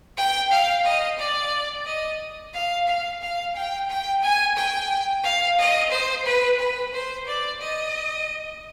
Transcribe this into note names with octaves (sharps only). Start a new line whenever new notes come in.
G5
F5
D#5
D5
D#5
F5
F5
F5
G5
G5
G#5
G5
F5
D#5
C5
B4
B4
C5
D5
D#5